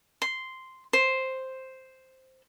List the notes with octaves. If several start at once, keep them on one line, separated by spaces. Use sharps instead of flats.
C6
C5